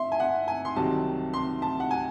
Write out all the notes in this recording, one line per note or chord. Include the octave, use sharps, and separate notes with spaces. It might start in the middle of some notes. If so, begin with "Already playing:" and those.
Already playing: E5 C6
G#5
F#5
G#5
C6
C2 C3 D#3 F#3 A5
C6
A5
F#5
G#5